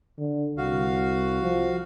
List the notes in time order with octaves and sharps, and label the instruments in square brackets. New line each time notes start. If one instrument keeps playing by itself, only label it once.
[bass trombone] D3
[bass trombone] C2 [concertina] F#4 F5
[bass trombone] F3